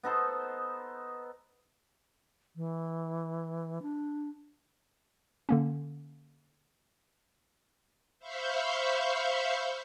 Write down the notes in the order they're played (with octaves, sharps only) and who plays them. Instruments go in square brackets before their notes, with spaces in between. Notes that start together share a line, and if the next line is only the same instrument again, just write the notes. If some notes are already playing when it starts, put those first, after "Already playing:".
[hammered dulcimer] B3 D#4 A4 C5
[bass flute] E3
D4
[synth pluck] D3 A#3 C#4
[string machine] C5 E5 F5 B5 C#6 G6